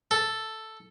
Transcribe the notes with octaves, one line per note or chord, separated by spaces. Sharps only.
A4